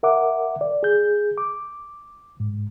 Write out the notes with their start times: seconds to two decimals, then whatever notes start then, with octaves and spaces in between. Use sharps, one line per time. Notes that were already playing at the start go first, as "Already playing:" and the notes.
0.03 A#4 E5 F#5 D6
0.61 D5
0.83 G#4 G6
1.38 D6
2.40 G#2